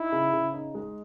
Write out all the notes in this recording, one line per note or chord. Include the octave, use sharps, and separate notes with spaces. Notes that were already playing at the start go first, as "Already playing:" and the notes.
Already playing: D#4 E4
C#3
C#3
D#4
G#3